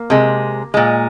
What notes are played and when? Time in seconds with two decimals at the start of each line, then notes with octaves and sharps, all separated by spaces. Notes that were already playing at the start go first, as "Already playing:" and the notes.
Already playing: A#3
0.10 C3 G#3
0.74 A#2 G#3